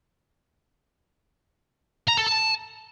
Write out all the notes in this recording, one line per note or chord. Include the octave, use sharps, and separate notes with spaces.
A#5
A4
A5